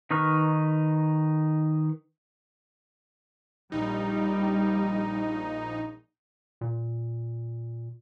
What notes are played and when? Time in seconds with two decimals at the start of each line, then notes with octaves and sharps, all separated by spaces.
0.11 D#3 D#4 B4 C#6 F6
3.72 A#1 G3 D#4
6.61 A#2